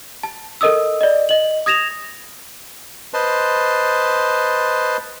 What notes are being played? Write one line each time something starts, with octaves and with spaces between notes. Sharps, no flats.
A5
A4 A#4 D#5 D#6 E6
D5 D#5
D#5 F#7
D#6 G#6 A#6 E7 F7
B4 C5 D#5 A5 C6